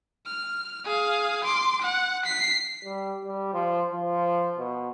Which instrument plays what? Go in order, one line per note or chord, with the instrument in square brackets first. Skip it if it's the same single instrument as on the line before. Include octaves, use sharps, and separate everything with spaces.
[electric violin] F6
G#4 F5
C6 D6
F#5
B6 C7
[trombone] G3
G3
F3
F3
B2